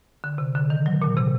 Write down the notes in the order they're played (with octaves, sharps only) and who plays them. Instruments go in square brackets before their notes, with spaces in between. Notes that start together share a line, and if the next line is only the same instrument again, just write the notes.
[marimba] D3
C3
D3
D#3
F#3
A#2
C3